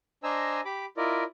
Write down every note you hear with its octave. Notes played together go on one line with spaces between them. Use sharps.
D4 C5 D#5 G#5 A#5 E6
G4 B5 D6
E4 F4 A#4 D5 D#5